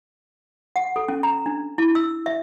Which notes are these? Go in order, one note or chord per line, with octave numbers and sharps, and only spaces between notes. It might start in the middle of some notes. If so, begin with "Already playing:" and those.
F#5
A4
C#4
A#5
D4
E4
E6
E5